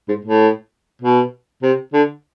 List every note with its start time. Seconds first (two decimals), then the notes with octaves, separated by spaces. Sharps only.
0.08 G#2
0.25 A2
1.02 B2
1.62 C3
1.93 D3